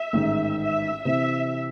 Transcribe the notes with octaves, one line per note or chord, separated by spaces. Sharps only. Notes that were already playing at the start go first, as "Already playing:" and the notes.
Already playing: E5
A1 G#2 D#3
E5
C3 E3 C4 E5